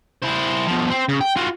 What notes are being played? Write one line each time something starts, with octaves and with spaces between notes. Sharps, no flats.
E4 C5
B2 F3
C4
C#3
G5
F4 F#4